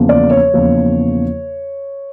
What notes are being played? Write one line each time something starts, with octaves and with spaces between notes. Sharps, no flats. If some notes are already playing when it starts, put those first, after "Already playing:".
Already playing: E2 C#3 F3 A#3
D5
C#5
E2 C#3 F3 A#3